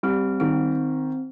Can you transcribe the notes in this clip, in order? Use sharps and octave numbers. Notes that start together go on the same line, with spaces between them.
G3 C4
D#3 C4